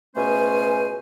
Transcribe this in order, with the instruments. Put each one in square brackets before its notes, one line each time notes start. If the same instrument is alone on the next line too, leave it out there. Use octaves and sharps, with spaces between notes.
[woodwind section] C#2 B2 A3 C#4 C5 G#5